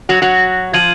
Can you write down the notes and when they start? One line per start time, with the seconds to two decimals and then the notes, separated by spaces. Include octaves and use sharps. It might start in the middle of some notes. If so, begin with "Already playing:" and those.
0.09 F#3 F#4
0.22 F#3 F#4
0.73 F3 F4 G#6 D#7 F#7